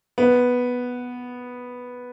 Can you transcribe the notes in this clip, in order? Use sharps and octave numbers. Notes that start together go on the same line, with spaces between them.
B3